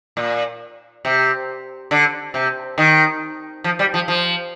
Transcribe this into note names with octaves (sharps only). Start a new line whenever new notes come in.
A#2
C3
D3
C3
D#3
F3
G3
F3
F3